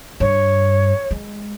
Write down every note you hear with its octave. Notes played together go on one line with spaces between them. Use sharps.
G2 C#5
G#3